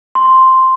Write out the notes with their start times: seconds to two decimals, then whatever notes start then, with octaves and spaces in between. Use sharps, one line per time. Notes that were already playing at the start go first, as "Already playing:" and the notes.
0.15 C6